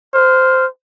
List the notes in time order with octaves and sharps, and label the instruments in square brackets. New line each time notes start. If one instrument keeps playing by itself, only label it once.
[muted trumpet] C5 [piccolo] F6